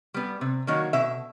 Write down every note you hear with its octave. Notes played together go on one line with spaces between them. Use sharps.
G3 B3
C3
D#3 F#3 A#3
B2 E5